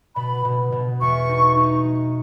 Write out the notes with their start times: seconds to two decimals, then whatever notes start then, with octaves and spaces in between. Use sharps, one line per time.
0.16 B2 B5
0.45 B2
0.72 B2
1.01 E2 C#6
1.29 D#4
1.57 D#4
1.85 G#3